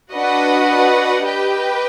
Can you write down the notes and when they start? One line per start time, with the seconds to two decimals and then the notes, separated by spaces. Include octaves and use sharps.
0.13 D4 F#4 B4 D#5 F#5
1.24 G4 B4 D#5 G5